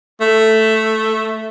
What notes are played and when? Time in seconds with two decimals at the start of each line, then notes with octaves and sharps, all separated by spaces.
0.21 A3